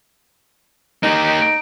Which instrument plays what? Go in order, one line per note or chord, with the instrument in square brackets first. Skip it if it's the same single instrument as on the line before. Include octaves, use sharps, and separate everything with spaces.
[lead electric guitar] A#3 G4 [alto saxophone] D#4